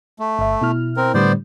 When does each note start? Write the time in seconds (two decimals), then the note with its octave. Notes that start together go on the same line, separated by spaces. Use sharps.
0.19 A3
0.39 G1 E5
0.62 B2 E4 F6
0.97 C4 A#4
1.14 A2 D3 G3 B3 C5 D5